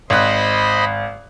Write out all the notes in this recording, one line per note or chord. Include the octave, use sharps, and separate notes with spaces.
G#1 C5 D#5 B5 F#6